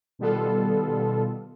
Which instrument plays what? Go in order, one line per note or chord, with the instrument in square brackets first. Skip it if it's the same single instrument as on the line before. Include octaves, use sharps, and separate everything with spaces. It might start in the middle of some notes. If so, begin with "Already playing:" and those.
[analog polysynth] B2 D#3 G3 B3 F4 A4